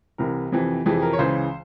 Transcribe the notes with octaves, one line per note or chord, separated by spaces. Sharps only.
C2 C3 E3 A#4
F2 C3 E3
F2 C3 E3 G#4
A#4
C#5
C#2 C#3 E3 C5